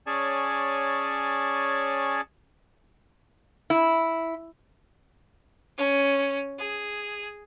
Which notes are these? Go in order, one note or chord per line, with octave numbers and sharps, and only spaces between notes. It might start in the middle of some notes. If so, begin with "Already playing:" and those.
C#4 G#4 C#5 D5 G#5 A5
E4
C#4
G#4